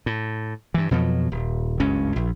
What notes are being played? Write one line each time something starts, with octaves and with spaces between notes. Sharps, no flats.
A2
G2 E3
F2 B2 F3 F#3
D#1
F#1 C#2 G2 C#4
A#1